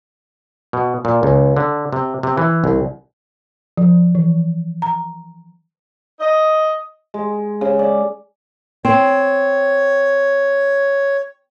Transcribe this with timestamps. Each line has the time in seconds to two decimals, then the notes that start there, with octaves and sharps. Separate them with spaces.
0.73 B2
1.05 A#2
1.23 C#2
1.57 D3
1.93 C3
2.23 C3
2.38 E3
2.64 C2
3.77 F3
4.15 E3
4.82 A#5
6.20 D#5
7.14 G#3
7.61 C#3
7.79 D5
8.85 C4 C#5